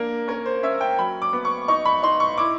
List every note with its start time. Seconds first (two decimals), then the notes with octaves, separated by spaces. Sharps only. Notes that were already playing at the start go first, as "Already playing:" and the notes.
Already playing: A#3 D4 A#4
0.28 C#4 A#4
0.46 C5
0.63 C#4 E5
0.81 G5
0.98 F#3 B5
1.22 D6
1.33 B3
1.45 C#6
1.68 D#4 C#6
1.85 B5
2.03 D#4 C6
2.20 C#6
2.38 E4 D6